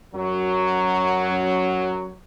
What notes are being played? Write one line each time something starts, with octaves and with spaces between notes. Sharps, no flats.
F#2 F#3